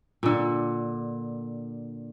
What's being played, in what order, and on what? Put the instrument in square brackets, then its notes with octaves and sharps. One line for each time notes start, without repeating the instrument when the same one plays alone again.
[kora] A#2 D3